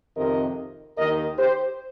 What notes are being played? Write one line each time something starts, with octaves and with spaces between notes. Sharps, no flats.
F2 C3 D#3 A#4 D#5
D#2 D#3 A#4 D#5
G4 C5